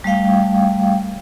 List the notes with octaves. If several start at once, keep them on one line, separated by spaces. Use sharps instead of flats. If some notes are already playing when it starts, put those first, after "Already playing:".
G3 A3 F5 G5